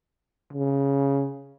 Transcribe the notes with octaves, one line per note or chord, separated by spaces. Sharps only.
C#3